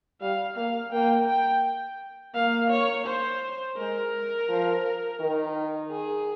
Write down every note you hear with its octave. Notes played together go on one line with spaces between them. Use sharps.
G3 F5
A#3 F5
A#3 G5
G5
A#3 F5
C#5
C5
G#3 A#4
F3
D#3
G#4